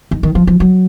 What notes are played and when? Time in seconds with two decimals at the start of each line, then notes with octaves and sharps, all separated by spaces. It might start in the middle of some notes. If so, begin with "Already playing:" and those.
0.11 D#3
0.23 D#3
0.35 F3
0.47 F3
0.60 F#3